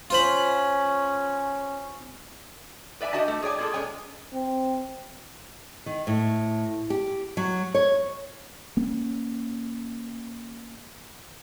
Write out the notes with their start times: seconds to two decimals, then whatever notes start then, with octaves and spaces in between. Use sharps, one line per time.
0.10 C#4 F4 C5 B5
3.01 B4 D5 E5 F5 G#5
3.13 D4 D#4 F#4 D#5 G#5 A5
3.28 A3
3.42 G#4 C#5 D5 G#5
3.59 A#2 G#4 A4
3.74 G#3 C#4 C#5 G#5
4.34 C4
5.86 D#3
6.07 A2
6.90 G4
7.37 F#3
7.75 C#5
8.77 A#3 C#4